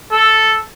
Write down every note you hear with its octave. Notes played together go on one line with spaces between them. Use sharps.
A4